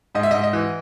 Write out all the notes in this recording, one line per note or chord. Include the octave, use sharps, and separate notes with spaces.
G#2 D#5
E5
G#2 D#5
D#5
E3